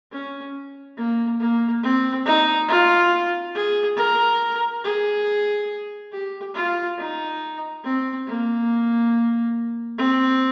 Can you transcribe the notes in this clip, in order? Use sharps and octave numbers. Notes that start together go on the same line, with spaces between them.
C#4
A#3
A#3
C4
D#4
F4
G#4
A#4
G#4
G4
F4
D#4
C4
A#3
C4